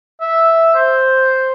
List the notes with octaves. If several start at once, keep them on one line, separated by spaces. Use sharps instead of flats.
E5
C5